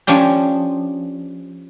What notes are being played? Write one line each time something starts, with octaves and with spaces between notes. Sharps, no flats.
F3 C#4 D4 G4